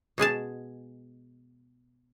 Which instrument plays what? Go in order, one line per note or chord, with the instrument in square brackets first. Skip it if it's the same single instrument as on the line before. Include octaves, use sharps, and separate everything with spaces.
[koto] B2 G#3 G#4 A5